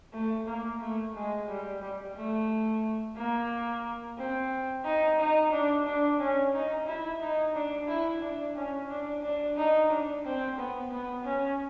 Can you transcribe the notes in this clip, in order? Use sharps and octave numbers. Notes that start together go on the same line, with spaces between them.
A3
A#3
A3
G#3
G3
G3
A3
A#3
C4
D#4
D#4
D4
D4
C#4
D#4
E4
D#4
D4
E4
D4
C#4
D4
D4
D#4
D4
C4
B3
B3
C#4